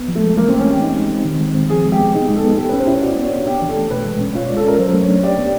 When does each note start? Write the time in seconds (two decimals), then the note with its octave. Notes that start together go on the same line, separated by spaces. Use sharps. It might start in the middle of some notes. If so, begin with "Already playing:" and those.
Already playing: B3
0.08 F3
0.15 A3
0.22 G#3
0.37 E3 A#3
0.48 C4
0.51 A3
0.59 C#4
0.66 C4 G4
0.82 D#4
0.96 G#3
1.10 C4
1.25 D#3
1.40 G#3
1.54 C4
1.70 F3 G#4
1.85 G#3
1.92 G4
2.00 B3
2.14 D#4 G#4
2.29 G#3
2.36 A4
2.44 B3
2.58 G4 A4
2.69 B4
2.73 C#4
2.80 C5
2.87 E4 C#5
3.02 F#4 D5
3.17 B3
3.25 C#5
3.31 D4
3.47 D4 G4
3.62 E3
3.69 A4
3.76 A3
3.90 B2 B4
4.05 G#3
4.21 C#4
4.35 F4 C#5
4.46 D5
4.50 G#3
4.57 A4
4.64 C#4 A#4
4.79 F#3 C5
4.93 A3
5.01 C#5
5.09 D4
5.23 G4 D5
5.38 B3